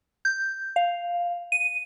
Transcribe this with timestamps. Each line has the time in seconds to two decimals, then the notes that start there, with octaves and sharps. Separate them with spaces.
0.25 G6
0.76 F5
1.52 D#7